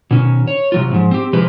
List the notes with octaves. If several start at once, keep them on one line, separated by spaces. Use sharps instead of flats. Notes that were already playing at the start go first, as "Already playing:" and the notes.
B2 D#3 C#4
C#5
C3 F#3 F4
G#2 F3
C4 G4
C3 F3 G#3 D#4 G4 B4